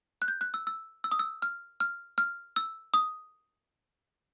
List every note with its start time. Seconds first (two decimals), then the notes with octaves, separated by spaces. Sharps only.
0.22 F#6
0.28 G6
0.41 F#6
0.54 E6
0.67 E6
1.04 E6
1.12 D#6
1.19 E6
1.42 F6
1.80 F6
2.18 F6
2.56 E6
2.94 D#6